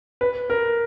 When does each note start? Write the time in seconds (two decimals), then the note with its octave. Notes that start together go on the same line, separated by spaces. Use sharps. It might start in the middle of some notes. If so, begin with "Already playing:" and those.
0.21 B4
0.50 A#4